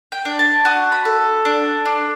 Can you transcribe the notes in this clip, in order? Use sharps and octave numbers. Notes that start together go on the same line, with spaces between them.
G5
D4
A5
F#4 D#6
B5
A4
D4
D4